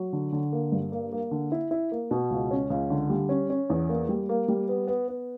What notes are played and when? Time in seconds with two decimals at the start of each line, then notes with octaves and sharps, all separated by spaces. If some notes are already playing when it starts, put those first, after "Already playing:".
Already playing: F#3
0.13 D3
0.32 D3
0.52 A#3
0.72 G2
0.92 A#3
1.12 A#3
1.31 D3
1.52 E4
1.71 E4
1.92 A#3
2.11 B2
2.30 C#2
2.51 C#4
2.70 C#2
2.90 D3
3.10 G3
3.29 C#4
3.50 C#4
3.70 E2
3.89 A#3
4.09 G3
4.29 A#3
4.48 G3
4.68 B3
4.87 B3
5.08 B3